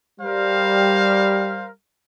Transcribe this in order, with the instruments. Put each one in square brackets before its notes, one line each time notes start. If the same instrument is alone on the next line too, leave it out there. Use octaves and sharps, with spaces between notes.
[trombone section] G3 [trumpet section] A#4 C5 F5